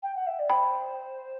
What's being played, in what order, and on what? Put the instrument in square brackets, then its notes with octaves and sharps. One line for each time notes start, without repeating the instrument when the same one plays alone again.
[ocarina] G5
F#5
E5
D5
[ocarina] C5 [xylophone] G5 B5